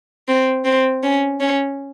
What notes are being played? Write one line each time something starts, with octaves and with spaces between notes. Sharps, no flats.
C4
C4
C#4
C#4